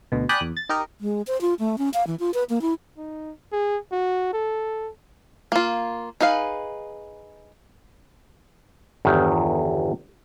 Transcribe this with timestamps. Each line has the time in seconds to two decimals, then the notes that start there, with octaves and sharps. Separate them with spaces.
0.12 D2 B2
0.29 D5 G5 G#5 B5 D#6 F#6
0.41 E2
0.57 A6
0.69 D#4 G4 A#4 D#5
1.01 G#3
1.27 C5
1.41 F4
1.59 A3
1.78 C#4
1.94 F5
2.07 E3
2.20 F4
2.34 B4
2.50 A#3
2.62 E4
2.98 D#4
3.52 G#4
3.92 F#4
4.33 A4
5.52 A#3 F4
6.20 D#4 G#4 B4 F5
9.05 G1 E2 D#3